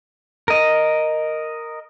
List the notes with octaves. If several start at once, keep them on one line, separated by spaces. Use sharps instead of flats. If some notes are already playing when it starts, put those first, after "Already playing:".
A#4 D#5